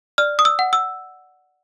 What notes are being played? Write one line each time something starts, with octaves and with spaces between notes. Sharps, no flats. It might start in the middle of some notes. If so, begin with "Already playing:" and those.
D5 F6
D#6
E6
F#5
E6